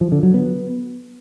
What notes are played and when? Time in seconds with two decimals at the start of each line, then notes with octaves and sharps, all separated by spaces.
0.01 F3
0.12 D3
0.23 F#3
0.34 B3